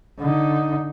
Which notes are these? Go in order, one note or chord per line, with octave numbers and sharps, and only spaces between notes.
D3 D#4